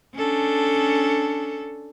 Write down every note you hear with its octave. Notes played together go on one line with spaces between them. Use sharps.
C#4 D4 A4